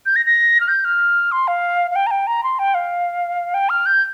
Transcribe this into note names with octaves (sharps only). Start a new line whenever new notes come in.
G6
A#6
A#6
F6
G6
F6
C6
F5
F5
G5
A#5
G5
A#5
C6
G5
F5
G5
F6
G6